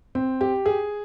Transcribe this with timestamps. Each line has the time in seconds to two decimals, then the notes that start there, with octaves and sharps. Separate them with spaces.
0.15 C4
0.41 G4
0.66 G#4